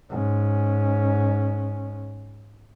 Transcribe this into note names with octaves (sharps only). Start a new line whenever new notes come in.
G#2 C#4